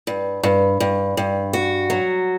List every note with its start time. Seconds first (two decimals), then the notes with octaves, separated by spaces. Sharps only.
0.07 G2
0.43 G2
0.80 G2
1.17 G2
1.53 F#4
1.90 F#3